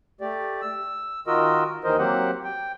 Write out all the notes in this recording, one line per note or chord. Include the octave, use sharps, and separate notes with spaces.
A3 G4 D5
E6
D#3 F4 F#4 A#4 D#5 E6
D#2 D#3 E3 A#4 C5 D#5
F#3 A#3 C4 G4 C5 F#5
G5